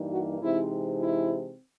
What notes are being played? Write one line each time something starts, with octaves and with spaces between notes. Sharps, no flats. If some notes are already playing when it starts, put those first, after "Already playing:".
Already playing: G2 E3 G3 A#3 D#4
F#4
C3 E3 G#3 C4 D#4 E4
E4